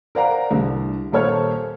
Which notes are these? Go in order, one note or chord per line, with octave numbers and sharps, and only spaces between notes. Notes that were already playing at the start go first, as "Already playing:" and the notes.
A#4 C5 D5 F5 F#5 A#5
C2 D3
D#1 A#3 A4 C5 C#5 F6